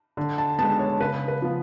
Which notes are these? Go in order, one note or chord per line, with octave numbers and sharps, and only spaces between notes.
D3
A5
G#3 B3 A5
C#5
C#3 B4
B4
F3 B3